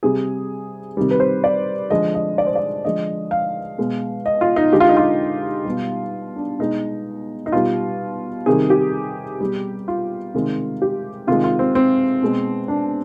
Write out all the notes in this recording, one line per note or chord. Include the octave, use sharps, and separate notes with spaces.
C3 G3 G#4
C3 D#3 G3
B4
C5
D5
D3 F3 G#3 D#5
D#5
D5
C5
D5
D3 F3 G#3 D#5
F5
B2 G#3
D#5
F4
D#4
D3 G#3 G4
F4
D#4
F4
B2 G3
D4
B2 G#3 D#4
D#4
B2 G3 F4
C3 D#3 G3 G#4
G4
B2 G3
F4
C3 D#3 G#3
G4
C3 D#3 G#3 F4
F4
C4
C4
B2 G#3
D4